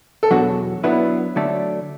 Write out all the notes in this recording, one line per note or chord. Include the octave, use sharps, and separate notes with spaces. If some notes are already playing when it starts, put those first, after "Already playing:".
A4
E2 B2 F#3 D4 F#4
F#3 B3 D4 E4 B4
D3 F#3 A3 D4 A4